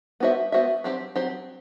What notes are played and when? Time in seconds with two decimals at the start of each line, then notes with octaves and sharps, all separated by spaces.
0.20 B3 F#4 C5 E5
0.52 B3 F#4 C5 E5
0.84 F#3 C4 G4 C5
1.16 F#3 C4 G4 C5